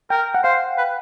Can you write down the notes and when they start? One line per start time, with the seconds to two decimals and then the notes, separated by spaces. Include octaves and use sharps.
0.10 A#4 G5
0.35 F#5
0.44 C5 F5
0.78 B4